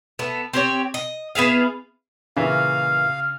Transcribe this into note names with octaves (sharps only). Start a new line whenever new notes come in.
A3 B3
C4 G4 C#5
D#5
B3 E4 G#4 F5
A#2 C#3 E3 E5 F5 F6